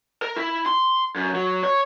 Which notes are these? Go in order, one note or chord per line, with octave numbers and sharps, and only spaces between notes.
A#4
E4
C6
F#2
F#3
C#5